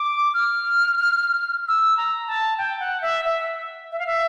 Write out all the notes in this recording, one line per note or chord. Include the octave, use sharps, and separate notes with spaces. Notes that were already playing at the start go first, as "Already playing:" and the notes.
Already playing: D6
F6
E6
A#5
A5
G5
F#5
E5
E5
E5
F5
E5